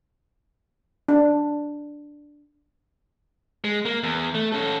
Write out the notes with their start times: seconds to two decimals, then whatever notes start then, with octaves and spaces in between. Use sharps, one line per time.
1.08 D4
3.64 G#3
3.85 A#3
4.03 E2
4.35 A3
4.52 C#4 A4